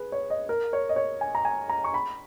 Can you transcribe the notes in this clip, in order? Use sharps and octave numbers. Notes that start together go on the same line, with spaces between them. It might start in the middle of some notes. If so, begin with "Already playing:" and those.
Already playing: G#4 B4
C#5
D#5
A#4
C#5
D#5
C#5
G#5
A#5
G#5
A#5
C#6
B5